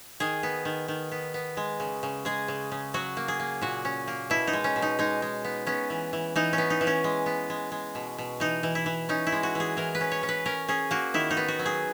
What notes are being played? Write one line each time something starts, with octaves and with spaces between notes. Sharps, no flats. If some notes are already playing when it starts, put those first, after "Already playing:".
D#3 G#4
B3
D#3
D#3
B3
B3
G#3
C#3
C#3
G#3 G#4
C#3
C#3
F#3 F#4
A#3
G#4
A#3
A#2 F#4
C#4
A#3
B2 E4
D#4
G#3
C#4
B2
D#4
G#3 D#4
G#3
B3
B3 C#4
E3
E3
E3 D#4
C#4
B3
D#4
E3
C#4
G#3
B3
G#3
G#3
B2
B2
E3 D#4
E3
E4
E3
C#4 D#4
E4
G#3
F#4
E3 G#4
E3 A#4
B4
C#4
C#5
C#4
B4
C#4 A#4
C#4 G#4
A#3 F#4
D#3 E4
D#4
B3
F#4
F#3
G#4